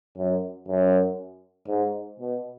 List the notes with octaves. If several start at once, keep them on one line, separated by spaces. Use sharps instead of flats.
F#2
F#2
G#2
B2